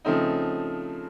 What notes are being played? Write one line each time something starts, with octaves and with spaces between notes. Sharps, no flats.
C#3 F3 A3 C4 D#4